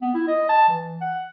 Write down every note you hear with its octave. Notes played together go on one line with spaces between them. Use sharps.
B3
E4
D#5
A5
E3
F#5